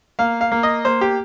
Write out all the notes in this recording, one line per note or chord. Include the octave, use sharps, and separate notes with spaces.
A#3 F5
F5
A#3
D#5
A#3 C5
G4